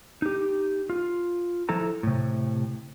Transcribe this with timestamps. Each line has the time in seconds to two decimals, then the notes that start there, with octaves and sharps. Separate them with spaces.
0.22 D#4 G4
0.90 F4
1.69 F3 E4 A4 A#5
2.03 A2 C3